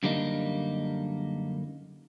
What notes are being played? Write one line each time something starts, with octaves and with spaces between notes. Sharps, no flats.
F#2 D3 G3 A#3 D#4